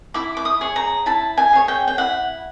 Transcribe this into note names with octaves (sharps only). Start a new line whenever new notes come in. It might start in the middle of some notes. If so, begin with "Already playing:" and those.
E4 D6
D6
D#6
G#4 C#5
A#5
E4 A5
G#5
G#4 C#5
G5
G5
E4 F#5